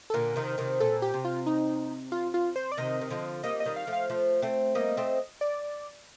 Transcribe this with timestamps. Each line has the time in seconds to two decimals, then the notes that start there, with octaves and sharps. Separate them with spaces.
0.10 A4
0.14 A#2 D3 A#4
0.36 C3 D#3
0.58 C3 D#3
0.80 A#2 A4
1.02 G4
1.14 C3
1.25 F4
1.46 D#4
2.12 F4
2.34 F4
2.56 C5
2.72 D5
2.77 C3 D#3 D#5
3.01 D#3
3.10 D3 F3
3.43 G3 A#3 D#5
3.60 D#5
3.65 D#3 G3
3.76 F5
3.87 F3 A3
3.93 F5
4.10 F3 A3
4.42 A3 C4
4.75 G3 A#3 D#5
4.97 A3 C4
5.41 D5